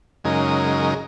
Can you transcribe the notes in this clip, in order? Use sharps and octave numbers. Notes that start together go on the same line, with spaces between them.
F#2 C#3 G#3 D#4 A#4